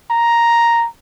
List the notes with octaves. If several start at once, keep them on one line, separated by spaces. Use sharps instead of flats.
A#5